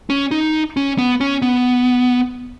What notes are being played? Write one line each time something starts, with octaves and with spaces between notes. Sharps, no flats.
C#4
D#4
C#4
B3
C#4
B3